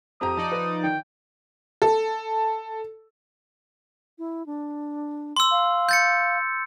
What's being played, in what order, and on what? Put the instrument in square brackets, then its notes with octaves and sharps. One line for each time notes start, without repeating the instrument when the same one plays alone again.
[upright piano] F2 G4 A#5 [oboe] D#6
[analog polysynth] F3 D#4 D5 [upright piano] A5
[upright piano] B4
[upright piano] D#3 [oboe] G5
[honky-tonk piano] A4
[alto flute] E4
D4
[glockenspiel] C6 E6
[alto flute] F5
[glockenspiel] G6 A6 C#7